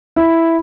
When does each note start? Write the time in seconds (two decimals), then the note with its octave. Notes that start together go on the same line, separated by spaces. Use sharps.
0.16 E4